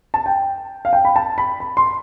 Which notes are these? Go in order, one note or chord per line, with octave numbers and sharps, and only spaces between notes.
A5
G5
F5
G5
B5
A5
B5
B5
C6